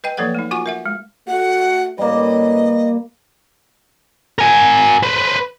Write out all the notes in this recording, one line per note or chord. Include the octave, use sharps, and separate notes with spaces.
B4 D#5 G5
F3 F#3 A#3 A4 B4 F#5
A3 D#4
F4 F#4 F#5 G#5 C#6
A#4 E5 F#5
G#3
A3 F#4 F#5
A2 G3 A#3 C#4 B4 D#5
A#4 G#5
B4 C5